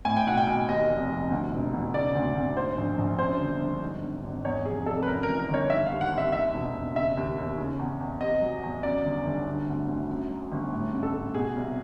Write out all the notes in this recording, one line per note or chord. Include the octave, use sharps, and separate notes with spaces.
A2 G#5
G5
B1 F#5
G5
B1
D#2 D#5
F1
F1
D2
E1
E1
C#3 D5
D2
D2
G#2 C5
A#1
A#1
F#2 C5
G1
G1
G#2
G#1
G#1
E2 C#5
F1 G#4
F1 A4
B4
F#2 A#4
A#4
E3
A#4
G1 C#5
D#3 E5
F5
D#2
F#5
D#2
E5
E2 E5
E1
E1
C#3 E5
D#2
D#2
C#3
E2
E2
C3 D#5
F#3
E2
F#2 D5
G1
G1
D3
D2
D2
F#2
F#3
G1
A2
A1
A4
A1
B2 G#4
C2